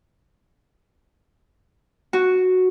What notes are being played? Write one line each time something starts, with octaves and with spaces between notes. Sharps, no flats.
F#4